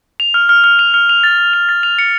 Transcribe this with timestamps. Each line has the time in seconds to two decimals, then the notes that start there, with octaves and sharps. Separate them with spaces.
0.20 F7
0.34 F6
0.49 F6
0.64 F6
0.79 F7
0.94 F6
1.09 F7
1.24 A6
1.38 A6
1.54 F7
1.69 A6
1.83 F7
1.99 C#7